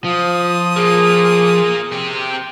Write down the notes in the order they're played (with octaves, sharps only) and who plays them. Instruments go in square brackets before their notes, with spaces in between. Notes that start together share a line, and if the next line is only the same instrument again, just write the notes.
[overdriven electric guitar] F3 [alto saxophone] F4 [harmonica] D#6
[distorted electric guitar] A#3 F4 [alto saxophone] G#4
[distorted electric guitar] C4 G4